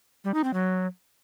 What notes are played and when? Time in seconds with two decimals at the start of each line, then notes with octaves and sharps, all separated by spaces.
0.24 G3
0.34 D#4
0.44 C4
0.54 F#3